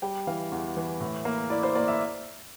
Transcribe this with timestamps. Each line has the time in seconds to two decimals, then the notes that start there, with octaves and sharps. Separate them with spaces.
0.02 G3 G5
0.27 E3 F5
0.52 E2
0.77 E3
1.00 A2
1.25 A#3
1.50 E4 D5
1.63 C5
1.75 A#3 D5
1.88 E5